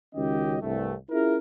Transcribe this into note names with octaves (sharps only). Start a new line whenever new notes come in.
C#2 D#3 C#4 F#4 G4 D#5
C2 G2 A3
C#4 E4 F4 G#4 A#4